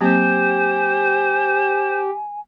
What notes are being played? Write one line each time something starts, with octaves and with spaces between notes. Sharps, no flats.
F#3 A#3 C4 G4 C5 G#5